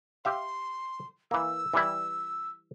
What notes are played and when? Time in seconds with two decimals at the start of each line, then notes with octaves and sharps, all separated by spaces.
0.25 G4 E5 F5 C6
1.31 E3 A#3 E6
1.74 E3 G3 E4